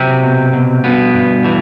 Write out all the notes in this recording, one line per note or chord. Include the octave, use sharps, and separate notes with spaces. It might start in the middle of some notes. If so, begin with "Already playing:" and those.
Already playing: C3 F#3 C4
B2
B2
G2 B2 B3
G2
E3